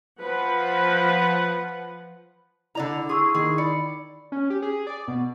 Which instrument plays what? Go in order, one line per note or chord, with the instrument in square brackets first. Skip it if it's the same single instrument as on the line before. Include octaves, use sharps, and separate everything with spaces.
[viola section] F3 B4 F#5
[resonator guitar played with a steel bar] D3 D5 A#5 [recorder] E4
[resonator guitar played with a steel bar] G#4 [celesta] C6 C#6 E6
[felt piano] D#3 [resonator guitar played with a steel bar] G#4
[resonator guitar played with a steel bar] D5 [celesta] B5 C#7
[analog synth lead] C#4
G4
G#4
D5
B2